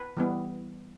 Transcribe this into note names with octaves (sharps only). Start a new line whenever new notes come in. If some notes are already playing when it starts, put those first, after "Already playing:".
Already playing: B4
E3 G3 B3